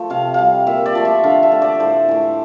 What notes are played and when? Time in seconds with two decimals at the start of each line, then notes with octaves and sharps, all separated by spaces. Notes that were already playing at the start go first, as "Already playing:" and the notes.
Already playing: F3 A3
0.10 C3 F5
0.34 G3 F5
0.67 A#2 E5
0.86 D5
0.95 F3 A3
1.05 E5
1.24 D3 F5
1.43 E5
1.52 A3
1.62 D5
1.80 A2 C5
2.09 E3 A3